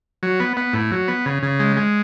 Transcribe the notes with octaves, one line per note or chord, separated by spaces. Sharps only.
F#3
B3
B3
A2
F#3
B3
C#3
C#3
G#3
G#3